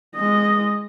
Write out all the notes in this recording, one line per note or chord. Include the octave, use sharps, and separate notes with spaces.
G#3 D#5